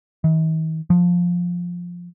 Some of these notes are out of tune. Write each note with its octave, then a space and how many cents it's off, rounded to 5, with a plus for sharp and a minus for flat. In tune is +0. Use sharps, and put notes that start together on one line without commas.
D#3 +45
F3 +10